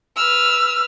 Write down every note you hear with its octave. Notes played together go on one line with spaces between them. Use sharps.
B4 E6 F6